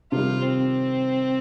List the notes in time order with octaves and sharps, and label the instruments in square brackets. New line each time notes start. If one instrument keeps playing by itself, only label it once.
[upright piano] C3 D#3 G3 [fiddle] F4
[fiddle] C4